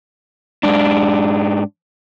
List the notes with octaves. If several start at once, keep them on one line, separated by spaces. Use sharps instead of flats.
G#2 D4